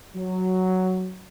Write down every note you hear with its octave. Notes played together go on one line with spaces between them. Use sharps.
F#3